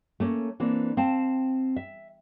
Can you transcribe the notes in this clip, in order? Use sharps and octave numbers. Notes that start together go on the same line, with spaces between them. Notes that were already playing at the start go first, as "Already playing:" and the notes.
A3 A#3 C#4
E3 A#3 C4 D4
C4 F5 A5
E5